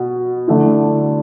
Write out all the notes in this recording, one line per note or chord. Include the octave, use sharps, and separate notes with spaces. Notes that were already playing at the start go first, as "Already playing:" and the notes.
Already playing: B2
D3 A3 E4